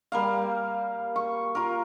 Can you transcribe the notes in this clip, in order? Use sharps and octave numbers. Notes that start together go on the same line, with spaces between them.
G3 A#3 F5
C#6
F4 A#4